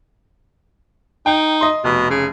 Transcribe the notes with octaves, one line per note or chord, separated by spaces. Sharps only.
D#4 G5
D#5 C6
F1 B2
C#3